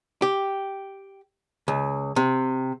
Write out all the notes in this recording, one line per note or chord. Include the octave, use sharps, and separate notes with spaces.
G4
C#2
C3